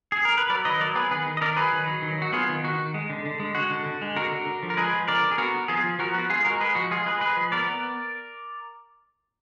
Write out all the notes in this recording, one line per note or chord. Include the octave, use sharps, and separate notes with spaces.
G#4
A#4
B4
F#3 A#4 D5
D#3 B4 D#5
F#3 A#4 D5
B3 G#4 B4
D#3 G#4 B4
D#3
D#5
D#3 A#4 D5
F#3 G#4 B4
D#3
F#3
D#3
F#3 F#4
B3 F4 G#4
D#3
D#3 F#4
D#3
G#3
D3
D3
G#3
G#3 F#4
D3
D3
G#3
D3 F#4 A#4
D3
D3
F3
A#4
G#3 G#4 B4
F3
D3 A#4 D5
D3
G#4
B3 F#4 A#4
B3
F3 F4 G#4
F3
F3 F#4 A#4
B3 F#4
G#3 F4 G#4
G#3 F#4 A#4
G#3 G#4 B4
F3 F#4
G#3 F4 G#4
G#3 G#4 B4
G#3 G#4 B4
F3
B3 A#4 D5
B3